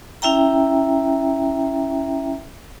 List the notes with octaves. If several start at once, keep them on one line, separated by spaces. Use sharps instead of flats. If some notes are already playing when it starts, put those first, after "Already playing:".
C#4 E4 E5 G5 A#5